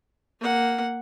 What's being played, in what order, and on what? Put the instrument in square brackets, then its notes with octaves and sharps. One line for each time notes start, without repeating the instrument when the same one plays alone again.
[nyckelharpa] A#3 F#5